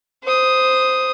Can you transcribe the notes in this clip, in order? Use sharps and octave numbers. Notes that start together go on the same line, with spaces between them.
C5 D#6